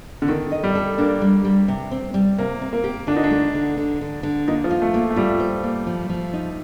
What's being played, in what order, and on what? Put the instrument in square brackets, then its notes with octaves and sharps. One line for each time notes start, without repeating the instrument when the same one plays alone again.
[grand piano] D3
[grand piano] D#3 [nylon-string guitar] A4
[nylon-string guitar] D#5
[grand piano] G3
[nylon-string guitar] A4
[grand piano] A#3 [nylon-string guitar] D4
[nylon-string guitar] G3
G3
C3
C4
G3
[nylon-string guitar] C3 [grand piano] A#3
[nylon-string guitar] C4
[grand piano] A#3
[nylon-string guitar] G4
[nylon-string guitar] D3 [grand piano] D4
[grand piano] D#4
D4
[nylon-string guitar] A3
D3
D3
D3
D3
[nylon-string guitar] A#3 [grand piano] D#4
[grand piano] F3
[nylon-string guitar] F4
[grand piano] A3
[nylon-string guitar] A#3
[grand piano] A3
[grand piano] G3 [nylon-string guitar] F4
[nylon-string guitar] C5
A#3
F3
F3
D#4